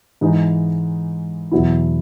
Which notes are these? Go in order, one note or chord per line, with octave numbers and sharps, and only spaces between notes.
G#2 E3 G#3 D#4
E2 B2 F#3 B3 E4